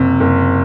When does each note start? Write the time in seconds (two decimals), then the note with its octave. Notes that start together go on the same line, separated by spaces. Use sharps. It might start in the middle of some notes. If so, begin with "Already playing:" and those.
Already playing: F#1 C3
0.20 F#1